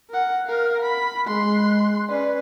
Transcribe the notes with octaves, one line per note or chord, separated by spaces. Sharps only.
A#4 F#5
A#4 F5
B5
G#3 C6 F#6
C#4 B4 D5